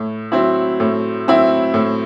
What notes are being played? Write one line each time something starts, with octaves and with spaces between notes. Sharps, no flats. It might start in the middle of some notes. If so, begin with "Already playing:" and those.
Already playing: A2
F#3 C4 E4
A2
F#3 C4 E4
A2